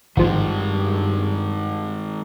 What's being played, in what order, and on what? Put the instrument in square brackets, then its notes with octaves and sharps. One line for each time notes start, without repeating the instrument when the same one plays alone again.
[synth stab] G#1 F3 [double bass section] G2 [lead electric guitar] D#3 G#3